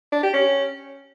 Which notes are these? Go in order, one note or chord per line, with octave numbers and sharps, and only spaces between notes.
D4
G4
C#4